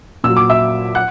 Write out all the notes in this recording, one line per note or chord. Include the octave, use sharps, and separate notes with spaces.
A#2 F#3 E6
D6
E5 E6
F#5 F#6